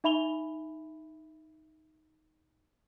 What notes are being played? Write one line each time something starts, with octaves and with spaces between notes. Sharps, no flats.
D#4 E5 B5 F7 G7